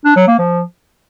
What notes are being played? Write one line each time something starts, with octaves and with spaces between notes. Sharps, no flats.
D4
F#3
A#3
F3